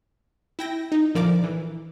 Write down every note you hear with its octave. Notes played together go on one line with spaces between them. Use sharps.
E4 G5 A#6
D#4
A#1 D3 F3 A#4 D5 D6
E3